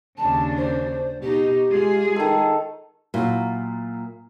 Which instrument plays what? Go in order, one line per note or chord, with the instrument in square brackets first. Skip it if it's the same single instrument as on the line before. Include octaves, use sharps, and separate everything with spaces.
[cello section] D#2 C#3 D4 [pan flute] A5
[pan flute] C5
[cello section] B2 D#4 [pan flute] G4
[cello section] G#3 F4 G#4
[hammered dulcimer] D#3 A4
[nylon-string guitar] A#2 [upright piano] F#3 E4 F4